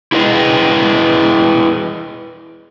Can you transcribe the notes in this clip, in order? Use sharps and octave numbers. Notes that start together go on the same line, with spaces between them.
E4 G#4 B4 D#5